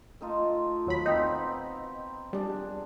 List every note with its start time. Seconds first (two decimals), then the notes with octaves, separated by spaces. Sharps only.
0.21 A3 D#4 F4
0.86 D#2 F#3 B5
1.06 B2 C4 D#4 A#5
2.33 G3 D4 G#4